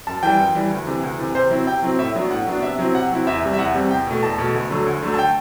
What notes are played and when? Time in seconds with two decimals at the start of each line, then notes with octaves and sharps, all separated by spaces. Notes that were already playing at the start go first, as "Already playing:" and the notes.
0.07 F#2 A5
0.23 E3 G3 G5
0.39 F#2
0.55 E3 G3
0.71 D2
0.87 C3 E3
1.03 D2
1.19 C3 E3
1.35 C3 C5
1.51 F#3 C4 E4
1.67 C3 G5
1.83 F#3 C4 E4
1.99 A2 E5
2.15 F#3 B3 D4
2.31 A2 F#5
2.47 F#3 B3 D4
2.62 C3 E5
2.79 F#3 C4 E4
2.95 C3 F#5
3.11 F#3 C4 E4
3.27 E2 E5
3.43 C3 G3 C4
3.53 E5
3.59 E2 F#5
3.74 C3 G3 C4
3.90 E2 G5
4.07 B2 A3
4.23 E2 A5
4.38 B2 A3
4.55 D2
4.70 D3 F#3 A3
4.86 D2
5.03 D3 F#3 A3
5.14 A5
5.19 G5